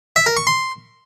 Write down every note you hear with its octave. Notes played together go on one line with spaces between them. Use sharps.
E5
A#4
C#6
C6